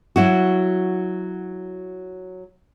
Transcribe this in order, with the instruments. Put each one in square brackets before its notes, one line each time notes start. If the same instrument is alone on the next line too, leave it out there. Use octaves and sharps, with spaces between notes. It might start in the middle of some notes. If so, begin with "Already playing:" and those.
[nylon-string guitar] F#3 E4 F#4